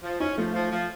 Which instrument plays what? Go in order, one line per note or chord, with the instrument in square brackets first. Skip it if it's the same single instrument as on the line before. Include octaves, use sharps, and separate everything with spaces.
[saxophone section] F3
[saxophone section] C#4 [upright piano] D#4
[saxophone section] F3 [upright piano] A3
[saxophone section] F3
F3